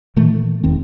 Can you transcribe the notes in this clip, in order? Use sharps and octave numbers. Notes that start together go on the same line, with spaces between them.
A#2 D#3 E3 A3
E1 E2 D#3 C4